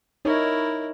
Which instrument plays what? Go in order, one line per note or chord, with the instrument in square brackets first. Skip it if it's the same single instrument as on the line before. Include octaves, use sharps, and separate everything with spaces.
[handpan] D#4 C#5 [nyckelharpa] E4 A#4